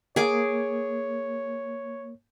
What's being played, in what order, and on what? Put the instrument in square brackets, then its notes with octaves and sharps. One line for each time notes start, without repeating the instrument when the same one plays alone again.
[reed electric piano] A#3 [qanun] G#4 D6 [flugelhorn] C#5